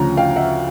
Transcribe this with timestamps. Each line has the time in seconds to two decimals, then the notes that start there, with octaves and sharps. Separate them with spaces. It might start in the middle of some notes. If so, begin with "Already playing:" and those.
Already playing: D2 C#3 F3 A#5
0.17 F5 G5
0.36 E5 F#5